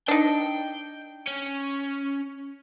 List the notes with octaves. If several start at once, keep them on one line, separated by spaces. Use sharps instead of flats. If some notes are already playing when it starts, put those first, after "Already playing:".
D4 D#4 G5
C#4